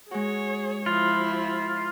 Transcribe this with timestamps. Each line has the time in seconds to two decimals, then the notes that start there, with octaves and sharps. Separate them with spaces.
0.11 G#3 F#4 G#4 C#5
0.86 F3 E4 F4